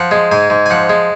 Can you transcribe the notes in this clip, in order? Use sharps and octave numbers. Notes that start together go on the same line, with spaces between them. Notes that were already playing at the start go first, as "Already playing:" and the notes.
Already playing: F3 F#5
G#3
G#2 G#5
G#2
G#5
F3 F#5
G#3